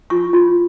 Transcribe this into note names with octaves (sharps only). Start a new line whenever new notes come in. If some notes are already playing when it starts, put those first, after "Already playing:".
F4 C#6
F4